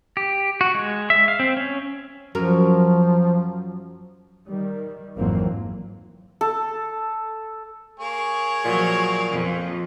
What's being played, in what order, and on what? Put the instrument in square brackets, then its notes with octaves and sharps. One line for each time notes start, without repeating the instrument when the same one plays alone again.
[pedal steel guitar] G4
F#4
G#3
E5
F5
C4
C#4
[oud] F#2 F#3 A#4 [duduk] F3
[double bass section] D#3 G3
G#1 F2 E3 F#3 A#3 C4
[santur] A4
[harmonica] A#3 G#4 C#5
[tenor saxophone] A#2 [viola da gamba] F3 F#3
[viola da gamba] F2